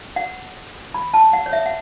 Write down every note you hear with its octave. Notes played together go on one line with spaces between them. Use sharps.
F#5
B5
A5
F#5
C#5
E5
F#5